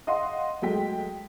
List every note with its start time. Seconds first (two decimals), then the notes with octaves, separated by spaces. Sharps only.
0.07 D#5 F5 F#5 C6
0.62 F#3 G#3 A3 G5 B6